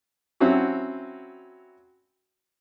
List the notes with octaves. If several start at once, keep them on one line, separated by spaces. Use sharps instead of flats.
F#3 C4 C#4 E4 F#4